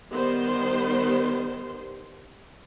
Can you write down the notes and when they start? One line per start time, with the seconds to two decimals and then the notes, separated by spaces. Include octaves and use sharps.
0.11 D#3 G3 B3 C5 C6